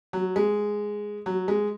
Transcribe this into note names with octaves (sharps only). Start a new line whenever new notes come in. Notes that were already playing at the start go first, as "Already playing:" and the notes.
F#3
G#3
F#3
G#3